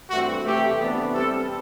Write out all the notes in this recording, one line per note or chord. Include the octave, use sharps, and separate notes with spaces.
G2 E3 A3 C4 F#4
C3 E3 A3 G4
C3 E3 B3 D4
C3 G3 C4 A4